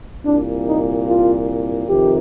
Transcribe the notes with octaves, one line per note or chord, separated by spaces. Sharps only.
C2 A#2 D4
D#4
F4
F2 C3 D#3 G4